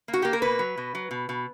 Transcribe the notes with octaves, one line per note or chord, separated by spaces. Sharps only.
A#3
F#4
A#3 G4
A#4
B2 B4
F#3
B2
F#3
B2
B2